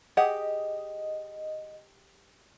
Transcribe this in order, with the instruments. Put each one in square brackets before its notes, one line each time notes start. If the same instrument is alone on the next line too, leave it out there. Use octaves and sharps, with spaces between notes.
[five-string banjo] G4 G#4 F#5 [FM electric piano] D#5